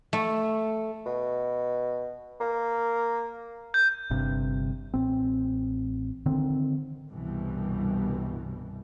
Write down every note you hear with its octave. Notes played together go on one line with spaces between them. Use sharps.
A3
B2
A#3
G6
G1 G2 C3
A1 C4
D3 D#3 C4
C2 G2 B2 E3 G3